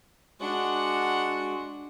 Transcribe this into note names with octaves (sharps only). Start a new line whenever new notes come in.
G#3 D4 F#4 F#5